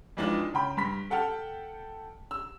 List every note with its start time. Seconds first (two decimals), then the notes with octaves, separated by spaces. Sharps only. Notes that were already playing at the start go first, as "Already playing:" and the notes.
0.17 F2 E3 G#3 D4 D#4 F4
0.54 C#3 G5 B5
0.77 G2 B5 B6
1.10 A4 F#5 G5 A5 F6
2.31 E6